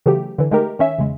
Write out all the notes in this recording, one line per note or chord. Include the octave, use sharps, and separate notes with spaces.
C#3 E3 F#3 A3 G4
D3 E3
G#3 A3 D#4 G4 A#4
D#3 C#4 E5
E2 C#3 G#3